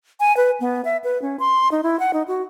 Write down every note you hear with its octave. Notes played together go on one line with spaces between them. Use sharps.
G#5
B4
B3
E5
B4
C#4
C6
D#4
E4
F#5
D#4
F#4